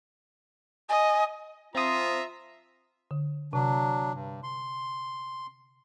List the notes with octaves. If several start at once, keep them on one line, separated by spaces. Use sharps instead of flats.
D#5 G#5
F3 C4 F4 E5 A#5 D#6
D3
C3 F#3 D4
G2
C6